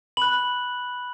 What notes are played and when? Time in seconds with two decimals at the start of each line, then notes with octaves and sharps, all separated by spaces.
0.17 B5 F#6 F#7